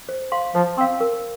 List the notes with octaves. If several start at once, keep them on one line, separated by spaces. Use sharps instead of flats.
C5
F5 C6
F3 C5
C4 F5 C6
A#4